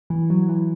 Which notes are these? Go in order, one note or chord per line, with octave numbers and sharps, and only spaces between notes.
E3
F#3
E3